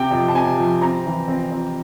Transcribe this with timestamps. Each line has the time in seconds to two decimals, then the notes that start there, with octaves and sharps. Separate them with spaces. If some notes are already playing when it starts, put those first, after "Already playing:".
Already playing: C3 C4 G5
0.11 F2
0.28 A5
0.34 C3 G#5
0.58 F3
0.81 C4 A#5
1.06 E3
1.28 C4
1.52 C4